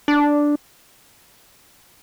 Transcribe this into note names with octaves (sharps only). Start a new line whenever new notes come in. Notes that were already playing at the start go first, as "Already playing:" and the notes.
D4